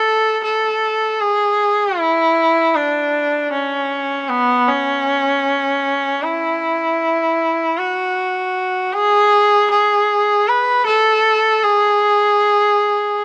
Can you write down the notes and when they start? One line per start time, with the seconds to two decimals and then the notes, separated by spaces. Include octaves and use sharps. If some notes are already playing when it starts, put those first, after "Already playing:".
Already playing: A4
0.44 A4
1.21 G#4
1.98 E4
2.76 D4
3.52 C#4
4.30 B3
4.68 C#4
6.23 E4
7.78 F#4
8.93 G#4
9.71 G#4
10.48 B4
10.86 A4
11.64 G#4